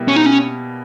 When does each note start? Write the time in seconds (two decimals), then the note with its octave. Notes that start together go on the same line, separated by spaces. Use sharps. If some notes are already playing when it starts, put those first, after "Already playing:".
Already playing: B2 G3 A#3 E4 G4
0.08 C#4
0.16 D#4
0.26 C#4